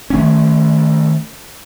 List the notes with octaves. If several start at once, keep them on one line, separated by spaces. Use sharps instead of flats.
D#3 A3 C#4